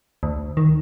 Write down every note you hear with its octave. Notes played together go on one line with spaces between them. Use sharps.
D2
D#3